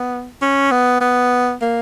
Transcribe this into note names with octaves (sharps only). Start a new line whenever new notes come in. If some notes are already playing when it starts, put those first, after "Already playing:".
Already playing: B3
C#4
B3
B3
A#3